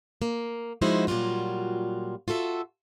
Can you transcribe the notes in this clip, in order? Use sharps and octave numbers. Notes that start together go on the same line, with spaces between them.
A#3
F3 G#3 D#4 E4 F#4 C5
A#2 F#3 G3 F4 F#4
F4 F#4 A4 E5